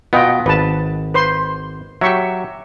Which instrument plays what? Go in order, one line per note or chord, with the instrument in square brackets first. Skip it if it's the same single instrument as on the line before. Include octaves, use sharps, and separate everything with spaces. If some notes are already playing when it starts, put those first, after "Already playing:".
[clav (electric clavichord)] B2 B3 [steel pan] F4 D#5 G5
[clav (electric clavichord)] G#1 [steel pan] B4 A5
[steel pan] B4 C5 C6
[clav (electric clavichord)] F#3 G4 [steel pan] E5 C#6